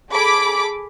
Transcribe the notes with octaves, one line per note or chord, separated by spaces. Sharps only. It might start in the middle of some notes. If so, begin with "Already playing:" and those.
G#4 A4 B5 D6